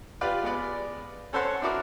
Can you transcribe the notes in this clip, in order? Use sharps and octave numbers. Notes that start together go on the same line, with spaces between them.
F4 G4 B4 D5
G#3 B3 D5
C#4 A4 C5 C#5 F#5 C6
D4 E4 F#4 A#4 D6